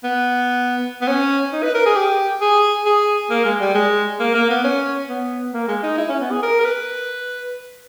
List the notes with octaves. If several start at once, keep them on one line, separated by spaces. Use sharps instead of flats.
B3
B3
C#4
D#4
B4
A#4
G#4
G4
G#4
G#4
A#3
G#3
G3
G#3
A#3
A#3
B3
C#4
B3
A#3
G#3
D#4
E4
C#4
B3
G#4
A#4
A#4
B4